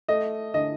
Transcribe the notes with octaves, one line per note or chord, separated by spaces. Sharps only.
A3 D#5
D3 D#5